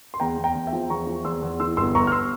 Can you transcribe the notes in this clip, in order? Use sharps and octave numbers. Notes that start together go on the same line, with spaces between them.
C6
E2 G5 A#5
E2
G5 A#5
E2
E5 G5
F3
E2 A#5 C#6
F3
E2 C6 E6
E2
E3 C6 E6
G1 C6 E6
G1 A#5 C#6
F6
C6 E6